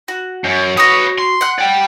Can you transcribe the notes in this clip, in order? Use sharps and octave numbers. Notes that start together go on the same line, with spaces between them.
F#4
F#2
F#4 B4 C#5 D#6
C6
F#5 F#6
D5 G5